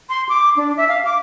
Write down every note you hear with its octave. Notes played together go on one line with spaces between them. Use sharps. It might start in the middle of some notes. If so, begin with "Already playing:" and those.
C6
D6
D4
E5
F5
D6